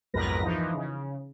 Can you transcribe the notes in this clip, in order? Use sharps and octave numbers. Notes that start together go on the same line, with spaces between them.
B1 F2 G#2 A#4 B4 A#6
E3 F3 D#4
C#3